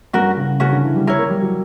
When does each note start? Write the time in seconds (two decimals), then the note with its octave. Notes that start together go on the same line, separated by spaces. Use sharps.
0.13 G2 C#4 F#4 A#4
0.37 C#3
0.60 C#3 C#4 F#4 A#4
0.73 D3
0.84 E3
0.96 G3
1.07 E4 A#4 C#5
1.18 A#3
1.30 G3
1.42 F#3